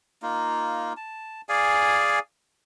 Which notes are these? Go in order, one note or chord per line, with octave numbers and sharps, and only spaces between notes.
A#3 D#4 F4
A5
G#4 D5 F5 G#5